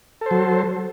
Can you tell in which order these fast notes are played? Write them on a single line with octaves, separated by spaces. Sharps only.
A4 C5 F#3